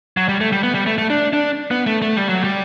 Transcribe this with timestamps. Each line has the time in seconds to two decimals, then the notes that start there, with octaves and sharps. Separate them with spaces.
0.17 F#3
0.28 G3
0.41 A3
0.52 G3
0.63 B3
0.75 G3
0.86 A3
0.98 A3
1.10 D4
1.33 D4
1.71 B3
1.87 A3
2.02 A3
2.16 G3
2.29 F#3
2.44 G3